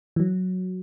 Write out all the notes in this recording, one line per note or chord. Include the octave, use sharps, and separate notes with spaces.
E3
F#3